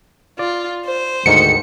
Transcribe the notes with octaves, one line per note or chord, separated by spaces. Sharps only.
F4 D5
C5
D2 G#2 D#3 C#7